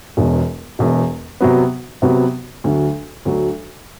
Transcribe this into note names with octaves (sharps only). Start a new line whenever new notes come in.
E1 E2 B2
E1 E2 B2
C3 F#3 B3
C3 F#3 B3
D2 D3 F#3
D2 D3 F#3